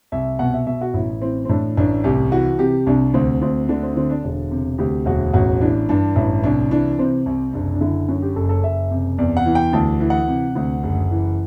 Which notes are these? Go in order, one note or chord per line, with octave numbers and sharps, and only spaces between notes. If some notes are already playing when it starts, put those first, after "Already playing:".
C2 E5
B2 F#5
E5
B2 E5
F#4
A1 E4
E3 C4
C4
A2 D4
A1 D4
C2 G4
E3 F#4
C3 G4
C2 D4
D2 C4
D2 C4
D3 D4
C4
D3 C4
D4
E1
C3
D2 G4
E1 F#4
A1 F#4
E3 D4
G2 D4
A1 E4
C2 D4
E3 D4
C3 C4
C2
F#1 D4
D4
D3 E4
F#2
G4
F#1 A4
A4
F#1 E5
C3
E2 D5
F#5
E3
G5
D2 A5
E3
F#5
C3
D2
F#1
E3